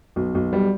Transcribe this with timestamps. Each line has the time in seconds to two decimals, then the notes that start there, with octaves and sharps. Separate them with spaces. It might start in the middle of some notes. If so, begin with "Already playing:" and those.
0.16 B1
0.35 B1
0.53 G3